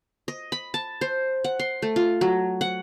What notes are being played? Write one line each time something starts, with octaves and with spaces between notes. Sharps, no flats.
D#5
B5
A5
C5
F#5
C6
A3
F4
F#3
F#5